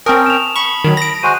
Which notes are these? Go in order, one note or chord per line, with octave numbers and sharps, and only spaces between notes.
C4 C#4 A#4 G5 A5 D#6
E7 F7
B5 C#6
D#3 F#3
A#6 D7
G#3 F#4 C5 F#6 D#7